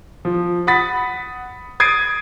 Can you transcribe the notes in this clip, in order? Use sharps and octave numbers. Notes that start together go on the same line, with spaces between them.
F3
F#5 B5 D#6 A6 B6
D#6 G#6 A6 C7 D7 D#7